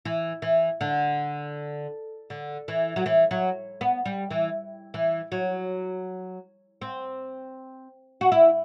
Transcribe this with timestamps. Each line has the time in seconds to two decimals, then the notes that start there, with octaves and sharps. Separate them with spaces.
0.05 E3
0.42 E3
0.81 D3
2.30 D3
2.68 E3
2.96 F#3
3.06 E3
3.31 F#3
3.81 B3
4.05 G3
4.31 E3
4.94 E3
5.32 F#3
6.82 C4
8.21 F#4
8.32 E4